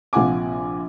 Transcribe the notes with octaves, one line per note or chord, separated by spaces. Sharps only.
A#1 C3 F4 F#5 G#5 D6